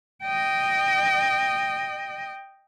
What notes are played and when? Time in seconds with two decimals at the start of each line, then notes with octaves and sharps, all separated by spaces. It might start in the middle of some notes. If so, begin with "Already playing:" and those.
0.24 D#5 G5